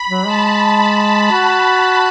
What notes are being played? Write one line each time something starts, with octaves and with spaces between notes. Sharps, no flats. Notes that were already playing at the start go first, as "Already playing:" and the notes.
Already playing: B5
F#3
G#3 A5
F#4